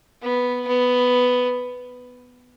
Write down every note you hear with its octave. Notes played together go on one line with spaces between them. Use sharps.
B3
B3